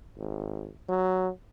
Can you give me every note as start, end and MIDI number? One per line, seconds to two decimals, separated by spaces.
0.17 0.70 32
0.89 1.29 54